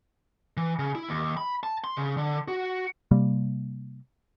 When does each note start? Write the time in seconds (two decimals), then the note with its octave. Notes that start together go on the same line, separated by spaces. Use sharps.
0.57 E3
0.79 C#3
0.95 E4
1.09 D#2
1.37 B5
1.63 A5
1.84 C6
1.97 C#3
2.17 D3
2.48 F#4
3.11 C3 G3 A#3